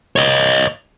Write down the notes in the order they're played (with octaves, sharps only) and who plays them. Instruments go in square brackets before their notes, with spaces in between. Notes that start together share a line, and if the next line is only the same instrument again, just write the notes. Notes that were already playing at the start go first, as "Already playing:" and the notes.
[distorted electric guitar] C#5 D#5